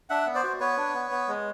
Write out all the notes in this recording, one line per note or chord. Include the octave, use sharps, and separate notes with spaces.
D4 E5 F#5
B3
C5 D5
F#4
B3 B4 C#5
D4
B3
B3
G#3